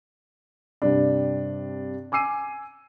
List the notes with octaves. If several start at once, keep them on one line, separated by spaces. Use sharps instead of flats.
G2 C3 D4
G#5 D6 E6 C7 D#7